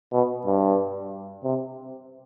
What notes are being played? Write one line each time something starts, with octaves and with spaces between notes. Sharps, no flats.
B2
G2
C3